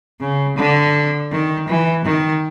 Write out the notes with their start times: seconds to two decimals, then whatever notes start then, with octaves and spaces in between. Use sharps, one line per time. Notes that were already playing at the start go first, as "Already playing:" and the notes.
0.20 C#3
0.56 D3
1.31 D#3
1.68 E3
2.05 D#3